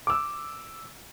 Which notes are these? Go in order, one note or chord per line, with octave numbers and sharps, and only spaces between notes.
D6 E6